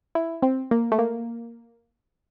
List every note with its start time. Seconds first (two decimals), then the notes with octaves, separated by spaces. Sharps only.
0.15 E4
0.42 C4
0.71 A#3
0.92 A3
0.99 A#3